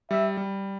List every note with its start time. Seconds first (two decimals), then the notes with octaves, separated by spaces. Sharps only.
0.11 G3 E5
0.37 G3